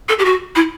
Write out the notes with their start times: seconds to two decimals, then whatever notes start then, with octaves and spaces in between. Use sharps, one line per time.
0.09 A4
0.19 G4
0.25 F#4
0.56 E4